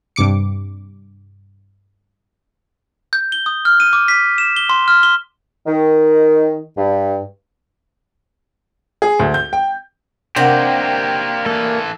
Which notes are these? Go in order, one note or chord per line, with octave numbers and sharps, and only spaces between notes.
G2 C3 D6 C#7
G6
G7
D#6
F6
D#7
D6
B6
E7
G7
C6
F6
G7
D#3
G2
G#4
D2
G6
G5
C3 A#3 D4 G4 A#4 C5 D5 F#5
E3 A#3 A4